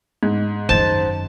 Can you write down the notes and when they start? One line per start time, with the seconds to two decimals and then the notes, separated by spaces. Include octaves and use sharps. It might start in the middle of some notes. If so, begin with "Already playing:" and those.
0.23 G#2
0.69 F#2 D#3 C5 A5